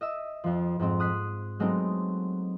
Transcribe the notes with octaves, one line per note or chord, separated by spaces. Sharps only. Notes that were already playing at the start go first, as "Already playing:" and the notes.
D#5 E5 E6
F2 F3
F2 G#2 C4
D#6 F#6 B6 C7
F#3 G#3 A3 B3 C4 D#4